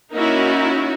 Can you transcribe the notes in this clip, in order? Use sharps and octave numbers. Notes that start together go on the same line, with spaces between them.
A#3 C#4 D#4 E4 F#4